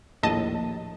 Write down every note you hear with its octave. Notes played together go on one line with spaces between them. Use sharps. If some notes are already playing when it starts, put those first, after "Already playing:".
A#1 D#2 A2 D#5 A5